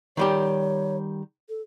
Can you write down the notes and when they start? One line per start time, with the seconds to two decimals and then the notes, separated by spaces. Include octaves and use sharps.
0.17 D#3 G3 G4 C#5
1.49 A4